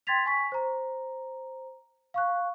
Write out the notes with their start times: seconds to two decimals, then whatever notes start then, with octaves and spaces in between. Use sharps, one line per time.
0.07 G5 C6 G#6 A6 B6 F7
0.26 G#5 C#6 B6
0.52 C5 A#5
2.14 F5 C#6 F#6